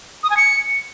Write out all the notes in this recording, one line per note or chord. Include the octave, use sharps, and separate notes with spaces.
D#6
G#5
C#7